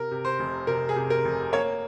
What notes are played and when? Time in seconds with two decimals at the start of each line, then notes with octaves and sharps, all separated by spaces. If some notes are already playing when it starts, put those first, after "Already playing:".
Already playing: C3 A#4
0.11 C3
0.25 C5
0.39 F1
0.67 C3 A#4
0.89 G#4
0.96 C3
1.10 A#4
1.25 F1
1.53 A#3 C#5